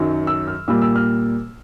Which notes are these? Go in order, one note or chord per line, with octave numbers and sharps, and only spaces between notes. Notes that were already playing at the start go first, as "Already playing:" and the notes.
Already playing: F#2 D#3 F#3
E6
F6
A#2 G3 A#3 E6
E6
F6